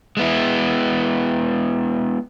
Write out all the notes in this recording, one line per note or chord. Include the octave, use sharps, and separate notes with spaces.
G#3 B3 E4